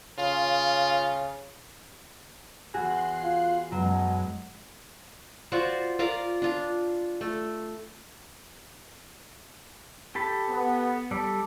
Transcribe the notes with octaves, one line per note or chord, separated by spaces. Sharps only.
C#3 F4
E2 F#4 G#4 C6 F#6 C7
F4
F#2 B2 F#3 G#3
F4 F#4 C5 D5
F4 A#4 D5 F5
D4 F4
A3
G4 A4 B5
B3
G3 A4 D5